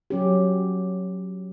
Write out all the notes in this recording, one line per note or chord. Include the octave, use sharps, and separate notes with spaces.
F#3 C#4 G4